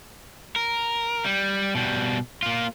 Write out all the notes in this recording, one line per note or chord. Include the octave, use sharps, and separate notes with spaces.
A#4
G3
B2 G3
A#3 F4